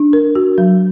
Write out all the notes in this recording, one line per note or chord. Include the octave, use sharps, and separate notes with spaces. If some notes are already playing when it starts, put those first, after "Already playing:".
Already playing: D4
A#4
F#4
F#3